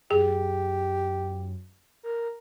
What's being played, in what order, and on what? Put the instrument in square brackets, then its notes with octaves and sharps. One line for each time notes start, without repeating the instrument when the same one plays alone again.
[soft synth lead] F#2 [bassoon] G4 [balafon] G#4
[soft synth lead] A#4